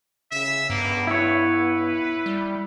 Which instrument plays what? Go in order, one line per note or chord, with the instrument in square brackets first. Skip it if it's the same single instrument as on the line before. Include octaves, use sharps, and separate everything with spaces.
[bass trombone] C#3 [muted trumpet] E5
[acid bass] G2 [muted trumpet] A#3 [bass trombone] B3
[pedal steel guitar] E4 C#5 [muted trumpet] B4
[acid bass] G3